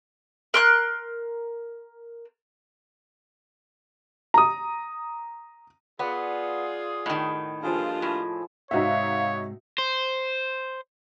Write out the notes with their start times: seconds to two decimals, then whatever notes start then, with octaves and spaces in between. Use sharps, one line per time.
0.54 A#4 C6 F#6
4.34 A#5 D#6
5.99 B3 F4 G#4 D5 F#5
7.06 A2 D#3 D#5
7.63 G2 F3 A#3 F4 G#4 A4
8.02 A2
8.71 G#2 C3 D#4 F#4 C#5 E5 F5
9.78 C5